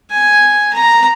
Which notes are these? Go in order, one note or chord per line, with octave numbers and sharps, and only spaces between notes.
G#5
A#5